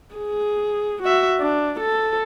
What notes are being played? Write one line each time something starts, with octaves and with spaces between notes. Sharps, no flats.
G#4
F#4 E5
D4
A4